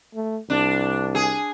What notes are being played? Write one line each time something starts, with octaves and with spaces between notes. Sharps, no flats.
A3
C2 D4
G#4